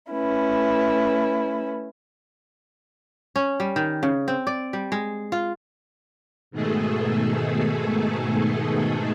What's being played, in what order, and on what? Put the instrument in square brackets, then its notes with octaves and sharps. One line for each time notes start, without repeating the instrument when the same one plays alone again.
[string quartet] A3 C#4 E4 B4
[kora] C#4
G3
D#3
C#3
C4
D5
G3
G#3
F4
[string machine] G#2 B2 D#3 A3 G#4 A4